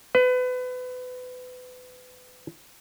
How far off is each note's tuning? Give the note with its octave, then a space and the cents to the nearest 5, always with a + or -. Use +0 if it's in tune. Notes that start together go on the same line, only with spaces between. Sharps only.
B4 +30